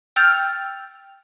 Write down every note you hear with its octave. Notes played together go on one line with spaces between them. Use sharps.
G5 E6 F6 G6 A6 F7